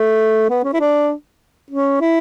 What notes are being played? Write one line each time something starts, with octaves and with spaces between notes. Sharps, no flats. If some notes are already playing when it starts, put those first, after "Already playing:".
Already playing: A3
B3
C#4
E4
D4
C#4
E4